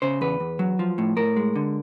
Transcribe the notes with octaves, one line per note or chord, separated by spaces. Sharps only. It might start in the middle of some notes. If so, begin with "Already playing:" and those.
C#3 C5
E2 B4
E2
F#3
F3
A2
A2 A#4
G#3
D3